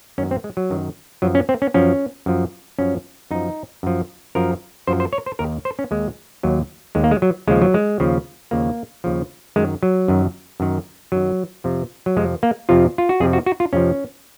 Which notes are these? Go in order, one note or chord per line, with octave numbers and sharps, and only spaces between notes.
F#2 D#3 C#4
C4
G#3
F#3
F#2 D#3
F#2 F3 F#3
C#4
C4
C#4
F#2 F3 C#4
F#2 F3
F#2 F3 C#4
F#2 F3 D#4
F#2 F3
F#2 F3 A#4
F#2 F3 C5
C5
C#5
C5
D#2 D#3 A#4
C5
C#4
D#2 D#3 G#3
D#2 D#3 F#3
D#2 D#3 G#3
A#3
G#3
F#3
D#2 C#3 F3 G#3
F#3
G#3
D#2 C#3 F3
D#2 C#3 F3 A#3
D#2 C#3 F3
F#2 D#3 G#3
F#3
F#2 D#3
F#2 D#3
F#2 D#3 F#3
F2 C3 F3
F#3
F2 C3 F3 G#3
A#3
F2 C3 F3 F4
F4
F#4
F2 C3 F3 G#4
F#4
F#4
F4
F2 C3 F3 C#4